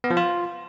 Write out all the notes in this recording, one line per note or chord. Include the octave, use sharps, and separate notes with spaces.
B3
F3
F4